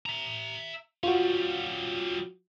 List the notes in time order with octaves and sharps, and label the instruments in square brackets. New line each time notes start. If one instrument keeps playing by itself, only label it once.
[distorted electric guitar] E5 A#5
[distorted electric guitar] G3 C#4 [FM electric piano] F4 F#4